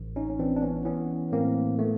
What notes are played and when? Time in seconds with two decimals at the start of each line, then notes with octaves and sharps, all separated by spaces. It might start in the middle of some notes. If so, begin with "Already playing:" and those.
Already playing: A1
0.16 C#4 D#4
0.30 C#4
0.39 E3 C4 D4
0.56 D4
0.62 B3 C#4
0.85 E3 B3 C#4
1.32 A2 A#3 C4
1.79 A3 B3